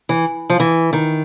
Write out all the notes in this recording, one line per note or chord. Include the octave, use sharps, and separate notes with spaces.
E3
F3
E3
D#3